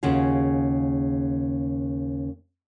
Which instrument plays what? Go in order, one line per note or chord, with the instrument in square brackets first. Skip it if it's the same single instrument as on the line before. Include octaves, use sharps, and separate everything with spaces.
[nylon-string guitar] D#2 C#3 F4 F#4 G#4